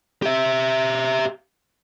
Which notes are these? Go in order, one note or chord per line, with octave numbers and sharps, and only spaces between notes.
G4 E5